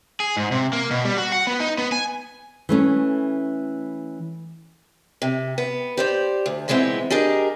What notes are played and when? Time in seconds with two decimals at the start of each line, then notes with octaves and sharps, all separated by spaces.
0.20 G#4
0.37 G#2
0.52 C3
0.73 A#3
0.91 B2
1.05 G3
1.18 F#4
1.32 F#5
1.47 B3
1.60 D#4
1.78 B3
1.92 G#5
2.69 E3 A3 C#4
5.22 C3
5.58 B3
5.97 G4 C5 D5
6.46 D2
6.68 A#2 E3 G#3 B3 C4 E4
7.10 D4 G4 G#4 A#4 D#5